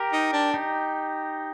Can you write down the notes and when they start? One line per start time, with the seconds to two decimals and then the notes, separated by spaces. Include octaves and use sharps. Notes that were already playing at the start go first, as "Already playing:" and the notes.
Already playing: G4 A#4
0.12 D#4
0.33 D4
0.54 D#4 G4